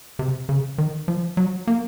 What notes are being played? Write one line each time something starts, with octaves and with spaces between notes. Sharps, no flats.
C3
C#3
D#3
F3
F#3
A#3